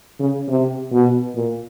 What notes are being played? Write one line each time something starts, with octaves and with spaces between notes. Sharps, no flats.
C#3
C3
B2
A#2